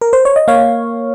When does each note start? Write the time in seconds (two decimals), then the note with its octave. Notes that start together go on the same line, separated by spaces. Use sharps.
0.01 A#4
0.13 C5
0.25 C#5
0.36 D#5
0.48 A#3 C#5 F5